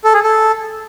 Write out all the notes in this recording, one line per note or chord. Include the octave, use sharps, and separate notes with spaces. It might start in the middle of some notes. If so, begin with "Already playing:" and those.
A4
G#4
A4